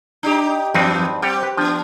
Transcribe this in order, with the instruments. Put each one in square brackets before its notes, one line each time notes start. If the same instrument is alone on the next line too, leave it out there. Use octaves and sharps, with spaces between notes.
[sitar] D4 D#4 G4
[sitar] E2 F#3 B4 [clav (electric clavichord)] G2 C4 D#4
[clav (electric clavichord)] G3 F#5 [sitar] C4 G4
[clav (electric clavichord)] B4
[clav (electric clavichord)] F3 [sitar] B3 D4